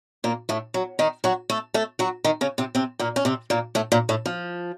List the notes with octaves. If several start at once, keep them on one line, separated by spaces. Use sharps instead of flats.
A#2 A#3
A2 A3
F#3
D#3 D#4
F#3 F#4
A3 A4
A3 A4
F#3 F#4
D#3 D#4
C#3 C#4
C3 C4
C3 C4
A#2 A#3
C#4
C3 C4
A#2 A#3
A2 A3
A#2 A#3
A2 A3
F3